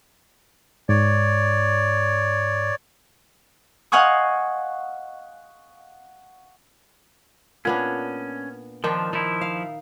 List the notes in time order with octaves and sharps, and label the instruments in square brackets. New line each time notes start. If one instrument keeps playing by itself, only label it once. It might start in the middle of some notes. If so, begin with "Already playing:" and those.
[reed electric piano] G#2 [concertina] C#5 D5
[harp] D#5 F5 F#5 G#5 C#6 D#6
[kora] A#2 B3 D4 [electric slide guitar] C#4
[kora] D#3 D4 G5 [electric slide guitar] F3
[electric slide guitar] F3 E4 [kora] D#4
[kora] F5